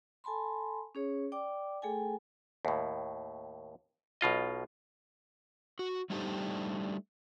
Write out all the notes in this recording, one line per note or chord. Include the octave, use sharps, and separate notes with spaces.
A4 G#5 A5 B5 C6
C#4 G#4 C#5
D5 G5 D6
A3 G#4 A4 G5 G#5
D#2 A2
B1 B2 F4 D#5
F#4
G3 A3 D4 D#4 G4 C5